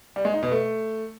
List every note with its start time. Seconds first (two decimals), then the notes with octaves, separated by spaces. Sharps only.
0.16 G3
0.25 G#3
0.34 D#4
0.43 B2
0.51 A3